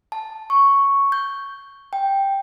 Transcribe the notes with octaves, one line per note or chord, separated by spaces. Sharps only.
A5
C#6
G6
G5